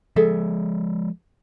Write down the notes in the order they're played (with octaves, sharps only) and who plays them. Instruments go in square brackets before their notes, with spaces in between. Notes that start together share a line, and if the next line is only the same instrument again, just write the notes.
[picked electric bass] F3 G#3 [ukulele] G#4 A4 E5